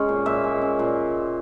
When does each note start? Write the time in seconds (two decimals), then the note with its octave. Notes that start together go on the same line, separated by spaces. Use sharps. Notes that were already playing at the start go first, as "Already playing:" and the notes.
Already playing: G#3 C#4
0.09 A#2
0.26 A#2 E5
0.44 G#3
0.62 C#4
0.79 A#2